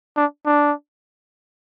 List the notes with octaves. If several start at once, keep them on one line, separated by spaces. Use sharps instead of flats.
D4
D4